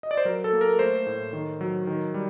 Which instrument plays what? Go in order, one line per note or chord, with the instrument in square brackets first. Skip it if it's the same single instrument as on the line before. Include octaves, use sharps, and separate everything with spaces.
[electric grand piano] D#5
D5
C5
F#3 A#4
A4
A#3
A#4
A3 C5
A2
D#3
F#3
D#3
G3